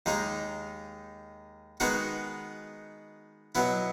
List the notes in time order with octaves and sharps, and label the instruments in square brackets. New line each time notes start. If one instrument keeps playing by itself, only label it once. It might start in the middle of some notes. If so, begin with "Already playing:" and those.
[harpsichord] D#2 D#3 G#3 D#4
D#3 G#3 B3 D#4 F#4
B2 F#3 B3 E4